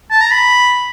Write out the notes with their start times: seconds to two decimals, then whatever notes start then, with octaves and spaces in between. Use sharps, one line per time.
0.11 A5
0.21 A#5
0.31 B5